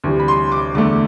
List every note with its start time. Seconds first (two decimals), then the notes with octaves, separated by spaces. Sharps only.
0.04 D2 C3 E3 G3
0.19 B5
0.28 C6
0.52 D6
0.75 E2 D3 A3 D6